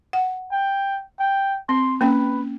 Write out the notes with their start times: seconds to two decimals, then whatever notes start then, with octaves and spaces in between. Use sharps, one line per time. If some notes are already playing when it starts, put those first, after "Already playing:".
0.13 F#5
0.52 G5
1.19 G5
1.69 C4 C6
2.01 A#3 C#4 B4 G5